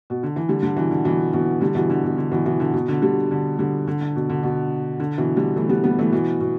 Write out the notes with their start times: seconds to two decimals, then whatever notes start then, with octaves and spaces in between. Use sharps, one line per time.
0.10 B2
0.23 D3
0.36 E3
0.49 D3 G3
0.63 D3 G3
0.76 B2 E3
0.91 D3
1.04 B2 E3
1.33 B2 E3
1.61 D3 G3
1.75 B2 E3
1.90 D3
2.04 B2
2.18 D3
2.32 B2 E3
2.45 B2 E3
2.60 D3
2.73 B2
2.88 D3
3.02 D3 G3
3.31 D3
3.58 D3 G3
3.87 D3
4.01 D3
4.16 B2
4.30 D3
4.43 B2
5.00 D3
5.18 B2 E3
5.37 D3 G3
5.56 E3 A3
5.69 G3 B3
5.84 G3 B3
5.98 E3 A3
6.12 B2 E3
6.40 B2